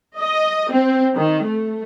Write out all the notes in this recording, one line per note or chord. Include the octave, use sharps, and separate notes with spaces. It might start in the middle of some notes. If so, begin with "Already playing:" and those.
D#5
C4
D#3
A3